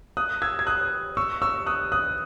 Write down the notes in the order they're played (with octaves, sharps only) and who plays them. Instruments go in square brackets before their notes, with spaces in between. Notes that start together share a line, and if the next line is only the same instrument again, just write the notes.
[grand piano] D#6 F#6
E6 G#6
G#6
D#6 F#6
C#6 E6
C#6 E6
D#6 F#6
D#6 F#6